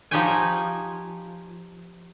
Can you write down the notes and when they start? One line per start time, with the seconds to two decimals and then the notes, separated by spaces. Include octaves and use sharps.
0.11 F3 D#4 G4 C#5 G5 G#5